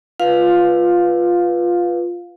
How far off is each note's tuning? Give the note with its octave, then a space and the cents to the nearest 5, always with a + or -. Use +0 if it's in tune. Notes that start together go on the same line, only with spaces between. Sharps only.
F4 +0 B4 -5 F5 +15